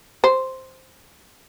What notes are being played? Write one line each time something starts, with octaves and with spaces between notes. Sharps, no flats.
C5